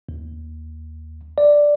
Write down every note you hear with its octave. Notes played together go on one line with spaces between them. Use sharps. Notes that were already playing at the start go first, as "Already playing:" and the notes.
D#2
D5